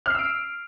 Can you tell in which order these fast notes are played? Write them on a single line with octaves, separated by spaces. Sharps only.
F6 C7 E6 D7